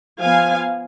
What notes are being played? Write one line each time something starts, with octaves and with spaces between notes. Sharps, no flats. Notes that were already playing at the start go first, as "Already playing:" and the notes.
F3 B3 F5 G#5